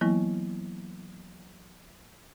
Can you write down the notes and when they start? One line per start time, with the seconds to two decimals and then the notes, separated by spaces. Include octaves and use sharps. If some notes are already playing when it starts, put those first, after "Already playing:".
0.01 E3 F#3 A#3 B3 E4